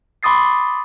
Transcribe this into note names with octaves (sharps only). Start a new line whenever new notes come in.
B5 C6 D6 D#6 A6 C7